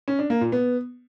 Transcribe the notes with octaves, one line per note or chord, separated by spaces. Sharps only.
C#4
D4
A#3
A#2
B3